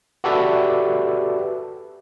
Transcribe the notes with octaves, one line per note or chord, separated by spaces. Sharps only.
F#4 G4 A4 B4 D5 E5